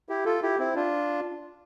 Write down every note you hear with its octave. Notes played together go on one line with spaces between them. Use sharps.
E4 G4
F4 A4
E4 G4
C4 E4
D4 F4